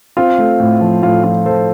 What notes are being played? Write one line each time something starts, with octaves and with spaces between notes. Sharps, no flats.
C4 F4
A3
A2
F3
A2 F4
F3 F4
F3 A4 C5